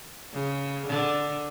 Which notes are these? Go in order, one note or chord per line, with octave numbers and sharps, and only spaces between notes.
C#3
D3